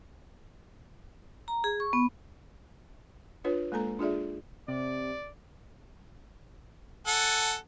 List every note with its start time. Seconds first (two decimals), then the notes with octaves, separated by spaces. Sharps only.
1.48 A#5
1.64 G#4
1.80 C#6
1.93 B3
3.44 D4 F4 B4 C#5
3.72 G#3 A#3 A4 A#5
3.99 D4 F4 G#4 D5 E5
4.68 C3 D5
7.07 A4 F#5 G#5